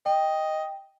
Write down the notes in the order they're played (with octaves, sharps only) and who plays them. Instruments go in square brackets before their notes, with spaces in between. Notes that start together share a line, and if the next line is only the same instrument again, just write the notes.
[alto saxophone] D#5 [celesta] G5